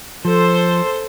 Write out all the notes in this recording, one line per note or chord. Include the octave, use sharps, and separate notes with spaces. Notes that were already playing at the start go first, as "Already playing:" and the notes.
F3 A4 C5